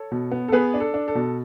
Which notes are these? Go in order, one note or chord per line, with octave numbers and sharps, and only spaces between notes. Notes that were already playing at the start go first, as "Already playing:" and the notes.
Already playing: A4 C#5
B2
B3
A4
B3 G#4 B4
D4
A4
D4
A4
B2